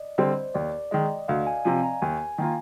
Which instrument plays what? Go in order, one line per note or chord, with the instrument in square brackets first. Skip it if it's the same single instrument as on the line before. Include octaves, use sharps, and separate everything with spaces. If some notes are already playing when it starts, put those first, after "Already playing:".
Already playing: [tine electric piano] D5 D#5
[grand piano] D3 G3 C4 [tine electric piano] C5
[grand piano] D#2 [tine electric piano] D5
[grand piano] D#3 G#3 [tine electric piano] D#5
[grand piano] D2 [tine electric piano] F5
[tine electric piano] G#5
[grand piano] C3 F3 [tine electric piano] G#5
[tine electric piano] A#5
[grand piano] D#2 [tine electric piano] G#5
[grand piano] D#3 A#3 F4